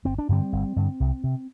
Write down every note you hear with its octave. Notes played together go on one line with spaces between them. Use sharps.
G1 C4
D4
G2 D3 G3 C4
G1
G2 D3
C2
C3